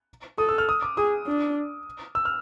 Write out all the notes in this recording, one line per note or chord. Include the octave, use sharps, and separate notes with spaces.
A4 D#6
E6
F6
D#6
D6
G#4 D#6
D4
E6
F6